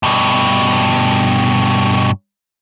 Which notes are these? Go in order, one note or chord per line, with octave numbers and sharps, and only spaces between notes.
G2 B2